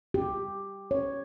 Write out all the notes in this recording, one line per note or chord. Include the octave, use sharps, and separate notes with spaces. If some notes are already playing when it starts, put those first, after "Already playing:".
G4
C#5